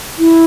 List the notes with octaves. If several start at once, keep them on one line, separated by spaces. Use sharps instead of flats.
E4